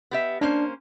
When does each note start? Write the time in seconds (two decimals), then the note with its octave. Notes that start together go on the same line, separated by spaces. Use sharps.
0.11 B3 G4 E5
0.41 A#3 C#4 D4 C5